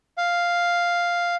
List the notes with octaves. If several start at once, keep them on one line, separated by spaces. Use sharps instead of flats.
F5